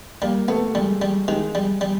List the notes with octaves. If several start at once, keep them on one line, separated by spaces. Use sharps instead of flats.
G3 A#3
A3 B3
G3 G#3
G3
D#3 G#3
G3
G3